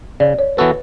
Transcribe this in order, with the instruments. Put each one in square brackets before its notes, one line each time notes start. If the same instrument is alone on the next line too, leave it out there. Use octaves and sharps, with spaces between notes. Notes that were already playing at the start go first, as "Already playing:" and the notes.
[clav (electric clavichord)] C#3 [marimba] D5
[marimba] C#5
[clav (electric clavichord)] E3 B3 F#4 A4 [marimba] B4